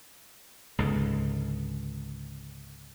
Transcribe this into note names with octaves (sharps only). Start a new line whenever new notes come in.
C#2 G#2 D3